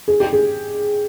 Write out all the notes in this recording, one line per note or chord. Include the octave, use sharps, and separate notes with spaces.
G#4
G4
G#4